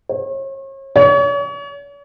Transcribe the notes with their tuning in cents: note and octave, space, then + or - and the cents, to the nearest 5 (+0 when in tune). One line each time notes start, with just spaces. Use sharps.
C#5 -40
C#5 +40